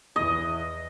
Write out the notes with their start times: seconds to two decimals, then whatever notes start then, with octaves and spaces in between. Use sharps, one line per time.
0.16 E2 E3 D#5